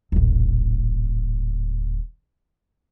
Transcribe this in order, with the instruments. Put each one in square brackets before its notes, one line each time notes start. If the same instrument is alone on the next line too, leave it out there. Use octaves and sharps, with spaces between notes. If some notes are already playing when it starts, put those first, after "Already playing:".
[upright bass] D#1 A1